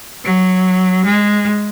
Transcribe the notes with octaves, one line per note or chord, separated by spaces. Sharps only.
F#3
G#3